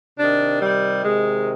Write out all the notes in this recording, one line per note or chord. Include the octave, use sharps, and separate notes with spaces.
C3 D#3 D4
G3
C3 D#3 G#3